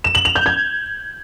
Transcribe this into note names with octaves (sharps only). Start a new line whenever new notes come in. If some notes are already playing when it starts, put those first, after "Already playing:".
E7
F#7
F7
G6
G#6